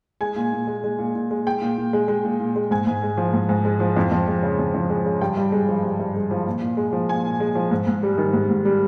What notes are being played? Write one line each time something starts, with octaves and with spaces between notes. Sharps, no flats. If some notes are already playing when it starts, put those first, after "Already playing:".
G#3 G#5
A#2
A#2
G#3
G#3
A#2
A#2
G#3
G#3 G5
A#2
A#2
G#3
G#3
A#2
A#2
G#3
G#2 G#5
G#2
G#3
F3
G#2
G#2
G#3
F3
F2
F2
G#3
C#3
F2
F2
G#3
C#3
G2 G5
G2
G#3
F3
G2
G2
G#3
F3
A#2
A#2
G#3
F3
A#2 G#5
A#2
G#3
F3
G#2
G#2
G3
D#3
G#2
G#2
G3